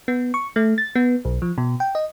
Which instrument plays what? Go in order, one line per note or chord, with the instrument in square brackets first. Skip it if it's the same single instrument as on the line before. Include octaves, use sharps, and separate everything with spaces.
[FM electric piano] B3
C#6
A3
A6
B3
B1
F3
B2
G5
D#5